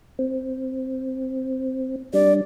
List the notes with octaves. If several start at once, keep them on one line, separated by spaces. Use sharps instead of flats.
C4
G3 D4 D5